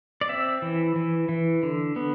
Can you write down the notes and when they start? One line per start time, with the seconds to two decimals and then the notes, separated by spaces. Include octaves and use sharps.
0.21 D5
0.29 C4 E5
0.62 E3
0.96 E3
1.29 E3
1.63 D3
1.96 B3